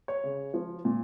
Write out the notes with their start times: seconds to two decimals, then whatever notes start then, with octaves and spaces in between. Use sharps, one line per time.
0.08 C#5
0.24 C#3
0.54 F3
0.85 A#2